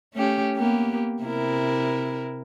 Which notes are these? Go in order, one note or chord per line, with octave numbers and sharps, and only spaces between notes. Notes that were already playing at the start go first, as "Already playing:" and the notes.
A3 C#4 G4
A#3 B3 G4
C3 E4 A#4